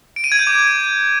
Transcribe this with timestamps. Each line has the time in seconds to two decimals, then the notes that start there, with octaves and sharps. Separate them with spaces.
0.16 D7
0.24 D#7
0.32 G#6
0.39 G6
0.47 D6